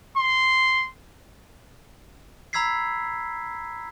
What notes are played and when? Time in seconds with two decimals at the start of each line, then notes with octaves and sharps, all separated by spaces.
0.18 C6
2.53 A#5 B5 E6 G#6 B6 C7